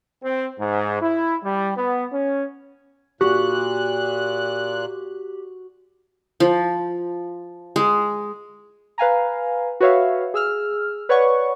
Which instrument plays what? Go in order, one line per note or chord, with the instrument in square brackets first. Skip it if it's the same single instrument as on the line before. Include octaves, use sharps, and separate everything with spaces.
[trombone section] C4
G#2
E4
G3
B3
C#4
[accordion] A#2 F#6 [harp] F#4 [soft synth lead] G4
[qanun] F3
G#3
[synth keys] B4 F5 G#5 A#5
F#4 B4 C#5 E5 F5
G#4 E6 F6
B4 C#5 D5 F#5 C#6